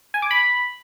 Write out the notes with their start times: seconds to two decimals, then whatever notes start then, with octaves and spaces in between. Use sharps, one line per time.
0.14 G#5
0.22 D6
0.31 B5